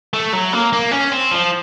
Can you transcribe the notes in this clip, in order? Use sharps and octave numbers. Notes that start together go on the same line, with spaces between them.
A3
F#3
A#3
A#3
C#4
C4
F3